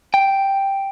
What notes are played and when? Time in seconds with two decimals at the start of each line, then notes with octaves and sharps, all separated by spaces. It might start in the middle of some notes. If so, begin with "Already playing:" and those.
0.14 G5